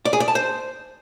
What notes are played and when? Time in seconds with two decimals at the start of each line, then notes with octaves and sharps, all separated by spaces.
0.05 D5
0.13 G#4
0.20 D5
0.28 A5
0.35 C5